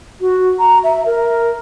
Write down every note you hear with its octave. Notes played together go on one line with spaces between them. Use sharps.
F#4
A#5
E5
A#4